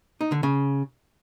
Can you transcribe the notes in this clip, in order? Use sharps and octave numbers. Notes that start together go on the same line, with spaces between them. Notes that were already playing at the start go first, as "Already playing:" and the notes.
D#4
D3
C#3